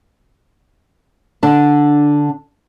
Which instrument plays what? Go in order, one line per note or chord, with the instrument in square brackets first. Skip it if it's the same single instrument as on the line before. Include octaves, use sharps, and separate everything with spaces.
[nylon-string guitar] D3 D4 A5